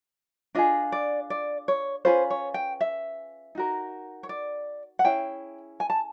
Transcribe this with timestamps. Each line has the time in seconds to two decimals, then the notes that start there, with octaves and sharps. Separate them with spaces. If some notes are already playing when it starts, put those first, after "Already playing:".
0.55 D4 F4 G#4 D#5
0.92 D5
1.30 D5
1.68 C#5
2.05 C#4 F4 G#4 B4 C5
2.30 C#5
2.54 G5
2.81 E5
3.55 D#4 F#4 A#4
4.23 C#5
4.29 D5
4.99 F#5
5.05 C#4 E4 G#4 G5
5.80 G#5
5.90 A5